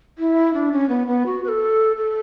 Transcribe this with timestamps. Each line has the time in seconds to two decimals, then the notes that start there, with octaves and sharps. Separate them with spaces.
0.18 E4
0.54 D4
0.72 C#4
0.89 B3
1.07 B3
1.26 F#4
1.44 B4
1.48 A4
1.97 A4